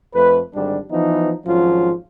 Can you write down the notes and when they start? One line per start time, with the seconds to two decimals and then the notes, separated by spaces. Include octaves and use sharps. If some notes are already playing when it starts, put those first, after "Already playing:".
0.14 F2 A3 B4
0.54 G#1 D3 G3 D4
0.90 E3 F3 B3 D#4
1.46 G#1 F3 F#3 C#4 F4